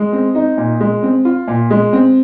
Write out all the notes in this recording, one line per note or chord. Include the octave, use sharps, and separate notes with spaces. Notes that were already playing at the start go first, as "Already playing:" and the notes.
Already playing: G#3
C4
D#4
A#2
G#3
C4
F4
A#2
G#3
C4